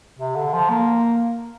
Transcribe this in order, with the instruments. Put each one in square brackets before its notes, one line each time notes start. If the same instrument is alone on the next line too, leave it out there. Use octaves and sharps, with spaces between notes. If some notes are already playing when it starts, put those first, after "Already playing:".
[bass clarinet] C3
D3
F3
A#3